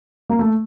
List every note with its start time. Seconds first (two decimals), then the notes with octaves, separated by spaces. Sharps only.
0.30 A#3
0.39 A3